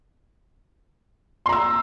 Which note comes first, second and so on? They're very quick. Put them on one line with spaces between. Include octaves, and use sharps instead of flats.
C6 A#5 E6